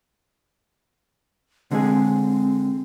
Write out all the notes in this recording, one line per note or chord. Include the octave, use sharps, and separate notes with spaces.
D3 G#3 C4 G#4